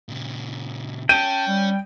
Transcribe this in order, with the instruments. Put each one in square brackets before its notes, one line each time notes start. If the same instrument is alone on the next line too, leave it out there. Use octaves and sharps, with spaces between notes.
[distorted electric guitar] A#2 C#3
[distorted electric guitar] C#4 [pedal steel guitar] G5 [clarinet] A5 [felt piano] D#7
[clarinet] G3